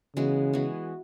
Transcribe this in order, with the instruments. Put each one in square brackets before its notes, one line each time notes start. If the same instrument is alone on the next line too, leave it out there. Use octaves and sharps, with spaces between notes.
[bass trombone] C#3 [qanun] E3 G#3 B3 F#4
[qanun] E3 G#3 B3 F#4